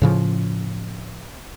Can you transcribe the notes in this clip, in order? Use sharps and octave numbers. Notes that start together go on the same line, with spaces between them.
A2 C#3 F3